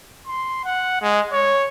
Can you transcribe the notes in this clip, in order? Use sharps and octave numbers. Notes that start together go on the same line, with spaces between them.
C6
F#5
G#3
C#5